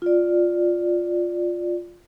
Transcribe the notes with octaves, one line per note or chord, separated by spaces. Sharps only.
F4 D5